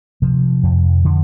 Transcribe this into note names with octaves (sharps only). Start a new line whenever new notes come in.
C3 F3
F2
D3